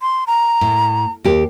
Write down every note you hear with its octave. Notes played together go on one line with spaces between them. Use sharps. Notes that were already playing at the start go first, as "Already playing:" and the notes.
C6
A#5
A2
D#2 G4